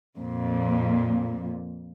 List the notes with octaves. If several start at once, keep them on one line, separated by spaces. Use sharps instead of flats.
F2 A#2